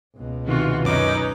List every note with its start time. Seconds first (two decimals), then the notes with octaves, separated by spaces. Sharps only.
0.17 C#2 B2
0.47 C3 D#3 E3 F4 F#4
0.85 F#2 C#4 D#4 B4 D6